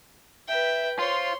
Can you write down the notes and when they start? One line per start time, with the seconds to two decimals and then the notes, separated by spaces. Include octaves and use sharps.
0.48 B4 E5 G5
0.99 F4 C5 C#5 C6